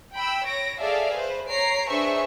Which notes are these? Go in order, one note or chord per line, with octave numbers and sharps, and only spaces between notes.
G5 B5 E6
C#5 A#6 D7
G#4 A4 D5 E5 F5
B4 C5
C#5 A#5 C7 D7
D4 G#4 B4 C5 E5 C#6